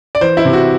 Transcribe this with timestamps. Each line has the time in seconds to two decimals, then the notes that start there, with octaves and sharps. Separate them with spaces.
0.15 D5
0.21 E3 C5
0.37 E4
0.45 C3
0.53 F#4